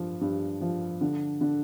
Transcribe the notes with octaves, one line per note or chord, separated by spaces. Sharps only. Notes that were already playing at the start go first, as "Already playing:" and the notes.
Already playing: G2 F3
G2
F3
D3
D3